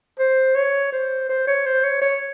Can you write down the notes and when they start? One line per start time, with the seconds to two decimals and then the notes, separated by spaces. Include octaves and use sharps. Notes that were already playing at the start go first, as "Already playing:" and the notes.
0.19 C5
0.55 C#5
0.92 C5
1.29 C5
1.47 C#5
1.66 C5
1.84 C#5
2.01 C#5